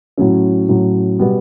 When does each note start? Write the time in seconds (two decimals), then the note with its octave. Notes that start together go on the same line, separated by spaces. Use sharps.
0.18 A2 F#3 C#4
0.69 A2 F#3 C#4
1.19 B2 G3 B3